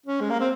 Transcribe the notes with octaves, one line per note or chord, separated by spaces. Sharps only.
C#4
G#3
A#3
C4